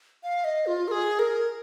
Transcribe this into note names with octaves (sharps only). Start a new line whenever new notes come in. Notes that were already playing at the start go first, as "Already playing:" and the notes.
F5
D#5
F4
A#4
G#4
A#4